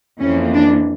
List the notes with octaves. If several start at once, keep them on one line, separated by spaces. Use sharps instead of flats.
F2 E3 A#3 C#4
D4